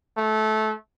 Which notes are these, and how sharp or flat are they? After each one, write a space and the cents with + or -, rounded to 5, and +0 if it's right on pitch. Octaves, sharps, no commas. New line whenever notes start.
A3 -20